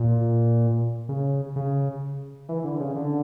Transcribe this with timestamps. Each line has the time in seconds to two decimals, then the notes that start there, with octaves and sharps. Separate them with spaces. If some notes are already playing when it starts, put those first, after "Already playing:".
Already playing: A#2
1.09 C#3
1.56 C#3
2.49 E3
2.64 D3
2.80 C#3
2.95 D3